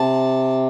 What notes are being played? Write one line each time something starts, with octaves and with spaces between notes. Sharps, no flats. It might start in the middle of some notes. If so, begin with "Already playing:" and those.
Already playing: C3 A5